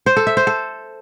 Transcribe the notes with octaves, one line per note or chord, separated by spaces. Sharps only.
C5
A4
E5
C5
A4